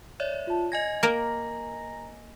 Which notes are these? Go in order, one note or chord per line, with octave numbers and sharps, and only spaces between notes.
C#5 D5 E5
F4 A5
D#5 G#5 G#6 A#6
A#3 A#4 A#5